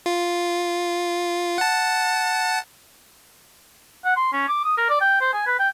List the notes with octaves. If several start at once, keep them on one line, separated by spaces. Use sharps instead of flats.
F4
F#5 A5
F#5
C6
C#4
D6
D#6
A#4
D5
G5
C5
G#5
B4
G5